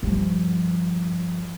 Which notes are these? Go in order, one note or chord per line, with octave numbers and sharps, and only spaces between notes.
G2 F3